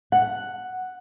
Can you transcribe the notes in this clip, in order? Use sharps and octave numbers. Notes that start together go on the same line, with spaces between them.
F#5